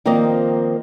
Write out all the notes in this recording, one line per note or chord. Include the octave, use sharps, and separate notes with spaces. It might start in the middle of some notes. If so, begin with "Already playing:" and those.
D#3 F3 A#3 C4 D5 D#5